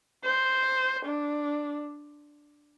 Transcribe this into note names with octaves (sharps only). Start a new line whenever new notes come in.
C5
D4